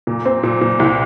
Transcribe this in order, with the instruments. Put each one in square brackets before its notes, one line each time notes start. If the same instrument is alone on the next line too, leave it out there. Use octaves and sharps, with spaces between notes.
[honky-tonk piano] A#2
C4
A#2
A#2
C2